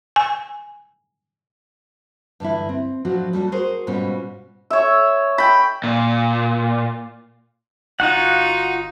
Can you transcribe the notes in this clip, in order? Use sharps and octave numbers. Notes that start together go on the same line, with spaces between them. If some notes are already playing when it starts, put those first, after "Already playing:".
G#5
G2 D3 E3 E4
C4
A2 F3 F#3 D4 F#4
G3 A3 C#4 F#4
F#4 G#4 A#4 C5
G#2 B2 G3 C#4 F4
C#5 E5
G5 B5
A#2
G1 D#4 F4 F#4 F#5